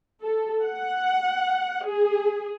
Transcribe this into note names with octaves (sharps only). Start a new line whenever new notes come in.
A4
F#5
G#4